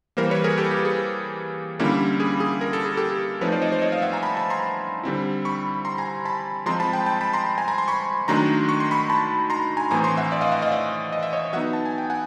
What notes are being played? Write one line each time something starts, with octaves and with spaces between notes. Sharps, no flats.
E3 G3 A#3 A#4 C5
B4 C#5
G#4 A#4
G4 A4
G4
G#4
D3 G3 A#3 C#4 E4
G#4
G#4
A#4
A4
G#4
G4 A4
F3 A3 C4 D#4 B4 C#5
C5 D5
C#5 D#5
C5 D5
C#5 D#5
D#5 F5
E5 F#5
G#5 A#5
A5 B5
A5 B5
A#5 C6
D3 G3 C4 E4
B5 C#6
A#5 C6
G#5 A#5
A5 B5
F3 G#3 C4 A#5 C6
A5 B5
G5 A5
G5 A5
A5 B5
A#5 C6
G#5 A#5
G#5 A#5
A#5 C6
B5 C#6
D#3 F#3 A3 D4 A#5 C6
C#6
C6
B5 C#6
A5 B5
A#5 C6
G#5 A#5
A2 E3 A3 C4 G#5 A#5
A#5 C6
E5 F#5
D5 E5
D#5 F5
E5 F#5
D#5 F5
D5 E5
D#5
E5
C#5 D#5
F#3 B3 D#4 E5 F#5
A5
G#5
G5
F#5 G#5